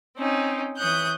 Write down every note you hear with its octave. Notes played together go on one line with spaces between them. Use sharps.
C4 C#4 D#4
E3 C#5 D#6 F#6 G6